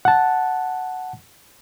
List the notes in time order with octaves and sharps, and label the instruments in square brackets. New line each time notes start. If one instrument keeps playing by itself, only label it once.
[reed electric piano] F#5 A5